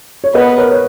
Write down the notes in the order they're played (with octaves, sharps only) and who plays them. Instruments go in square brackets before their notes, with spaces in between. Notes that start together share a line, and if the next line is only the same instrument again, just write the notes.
[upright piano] C#5
[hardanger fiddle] B3 [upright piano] B4 D#5
[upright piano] A#4 C#5
C#5